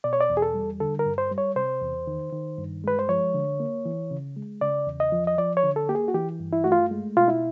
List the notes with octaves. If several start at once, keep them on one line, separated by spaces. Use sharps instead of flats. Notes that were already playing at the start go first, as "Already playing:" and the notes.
B2 D5
C#5
D5
E2
G#4
A4
G3
D3 A4
A#4
G2
C5
G3
C#5
C3 C5
E2
D#3
D#3
G2
G#3 B4
C5
F3 C#5
D3
A#3
E3
C#3
G#3
C#3 D5
E2
D#5
F3
D#5
F3 D5
C#5
D3
A4
A#3 G4
G#4
F#4
E3 G4
G2
E4
A3 F#4
F4
G#3
B2 F4
E4